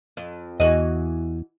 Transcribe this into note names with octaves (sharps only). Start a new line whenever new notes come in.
F2
E2 E3 F#4 D#5